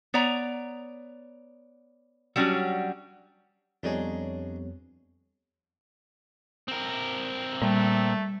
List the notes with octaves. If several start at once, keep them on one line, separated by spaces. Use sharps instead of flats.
B3 C#5 D5 A#5
F#3 G3 C#4 D4 F#4
F2 G3 B3 D4 D#4 G#4 C#5
C4 A#4
A#2 G3 A3